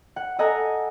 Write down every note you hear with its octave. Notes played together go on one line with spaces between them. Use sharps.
F#5
A4 D#5 F#5 G#5 A#5